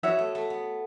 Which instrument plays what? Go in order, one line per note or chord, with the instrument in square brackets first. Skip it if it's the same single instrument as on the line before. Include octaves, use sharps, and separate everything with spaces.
[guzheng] B3 [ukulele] F#4 C#5 E5
[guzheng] A3
A3
B3